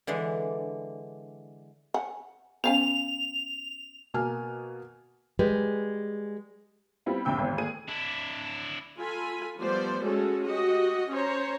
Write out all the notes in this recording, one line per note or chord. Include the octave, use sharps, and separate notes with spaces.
D3 E3 G#3 D4
F#5 G#5
B3 C#4 C5 F5 G#5 F7
B2 A#3 G#5 F6
G3 G#3 B4
G3 B3 C4 E4 F4
C2 F2 A2 D3 G5 E6
G#1 E2
D#2 A3 G#4 D#7
D4 E4
F4 A4 G#5 B5
F3 G3 A3 B3 C5 D5
G#3 A3 C#4 F#4 G#4 A4
F#4 G4 D#5
C#4 C5 C#5 A#5